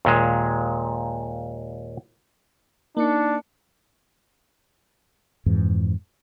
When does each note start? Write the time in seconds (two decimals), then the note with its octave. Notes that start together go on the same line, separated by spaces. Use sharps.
0.05 D#2 A#2 G#3
2.97 A#3 D4 D#4 C#7
5.46 F2 G#2 E3